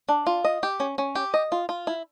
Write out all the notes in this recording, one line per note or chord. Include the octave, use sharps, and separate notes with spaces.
D4
F4
D#5
G4
C#4
C#4
G4
D#5
F4
F4
E4